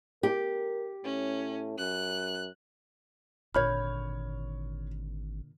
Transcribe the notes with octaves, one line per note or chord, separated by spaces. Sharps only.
G4 A#4
A2 C#4
F#2 F#6
G#1 A#2 D3 C#5 B5 F6 G6 G#6